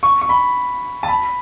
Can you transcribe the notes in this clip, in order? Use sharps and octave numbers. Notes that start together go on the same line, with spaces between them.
C#6
C#6
B5
A5
B5